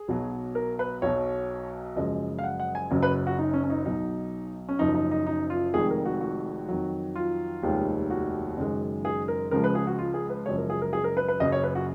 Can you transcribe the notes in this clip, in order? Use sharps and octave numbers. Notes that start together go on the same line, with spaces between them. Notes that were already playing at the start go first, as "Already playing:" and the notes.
Already playing: G#4
B1 B2 F#3
A#4
B4
B1 B2 F#3 C#5
F#1 F#2 F3 G#3 D#5
F5
F#5
F#5
G#5
F#1 F#2 C#3 F#3
B4
F#4
D#4
C#4
C#4
D#4
B1 B2 F#3 D#4
C#4
F#1 F#2 F3 D#4
D#4
D#4
D#4
F4
F1 F2 D#3 G#3 G#4
A#4
F#4
F#4
F2 D#3 F#3
F4
F1 D#2 D#3 G#3
F#4
F#1 F#2 D#3 G#3
G#4
A#4
C#2 C#3 F3 G#3 A#4
B4
G#4
F#4
F4
G#4
B4
F#1 F#2 C#3 F3 G#3 C#5
A#4
G#4
A#4
G#4
A#4
B4
B4
F#1 F#2 C#3 D#5
C#5
B4
F#4